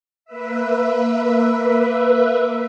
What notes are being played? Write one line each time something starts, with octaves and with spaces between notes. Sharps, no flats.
A#3 B4 E5